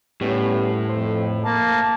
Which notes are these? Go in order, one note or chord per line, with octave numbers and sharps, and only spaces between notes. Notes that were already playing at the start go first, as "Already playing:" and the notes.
A2 G3 B3 C#4
F2 C5
A#3 A5